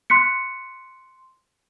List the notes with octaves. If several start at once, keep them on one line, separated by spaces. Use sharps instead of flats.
C6 F#6 B6 C#7